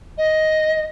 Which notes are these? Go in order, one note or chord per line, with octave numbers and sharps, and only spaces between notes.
D#5